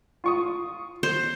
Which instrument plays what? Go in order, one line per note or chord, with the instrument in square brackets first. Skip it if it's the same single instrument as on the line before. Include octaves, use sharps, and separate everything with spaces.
[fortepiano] F4 C#6 D#6
[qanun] C5